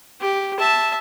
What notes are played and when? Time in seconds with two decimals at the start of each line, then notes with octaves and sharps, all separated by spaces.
0.21 G4
0.59 E5 A5